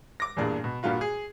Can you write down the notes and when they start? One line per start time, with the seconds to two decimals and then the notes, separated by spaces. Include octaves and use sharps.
0.20 D6 A#6
0.37 E2 G2 A#2 D4 G#4
0.64 B2
0.83 G2 A#2 G3 F4 F#4
1.01 G#4